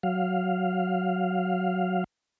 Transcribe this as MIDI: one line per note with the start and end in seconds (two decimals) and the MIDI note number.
0.03 2.04 54
0.03 2.04 77